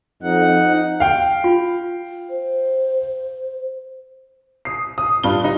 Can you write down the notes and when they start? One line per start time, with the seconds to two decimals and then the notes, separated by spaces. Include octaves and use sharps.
0.22 F2 D#4 F#5
1.00 F5 G5
1.44 F4
2.30 C5
4.65 D#6 C7
4.98 D#6
5.23 G2 F4 G7
5.44 D#4